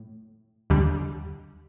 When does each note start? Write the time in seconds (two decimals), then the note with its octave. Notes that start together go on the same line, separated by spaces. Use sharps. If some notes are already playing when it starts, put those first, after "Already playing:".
Already playing: A2
0.70 D#2 D3 G3